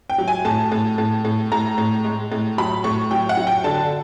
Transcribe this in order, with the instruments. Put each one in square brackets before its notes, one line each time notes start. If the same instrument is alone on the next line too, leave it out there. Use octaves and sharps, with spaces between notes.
[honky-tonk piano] G5
F#3
G#5
A2 A5
A2
A2
A2
A2 A#5
A2
G#3
A2
F#3 B5
A2 C#6
F#3 G5
F#5
F#3
G5
D3 A5